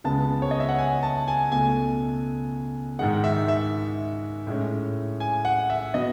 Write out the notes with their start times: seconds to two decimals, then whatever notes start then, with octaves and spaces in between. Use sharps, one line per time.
0.04 C#2 C#3 G#3 B3 A5
0.42 C#5
0.51 D#5
0.60 E5
0.69 F#5
0.78 G#5
1.03 A5
1.28 G#5
1.52 C#2 B2 A3 G#5
2.99 G#2 D#3 G#3 F#5
3.24 E5
3.48 E5
4.47 A2 G#3 C#4
5.20 G#5
5.45 F#5
5.70 E5
5.94 B2 F#3 B3 D#5